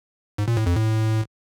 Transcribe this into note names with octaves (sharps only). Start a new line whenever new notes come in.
G#2
A#2
A2
F2
A2